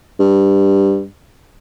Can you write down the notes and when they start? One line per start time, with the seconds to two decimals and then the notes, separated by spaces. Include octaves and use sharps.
0.20 G2